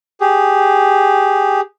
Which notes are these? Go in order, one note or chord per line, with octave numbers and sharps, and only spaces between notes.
G4 G#4